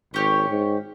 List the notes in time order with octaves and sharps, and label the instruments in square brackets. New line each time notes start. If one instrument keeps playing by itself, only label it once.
[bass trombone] G#1 [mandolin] C#4 G4 C#5
[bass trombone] G#2